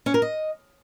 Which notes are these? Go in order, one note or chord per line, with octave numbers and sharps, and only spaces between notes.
C#4
A#4
D#5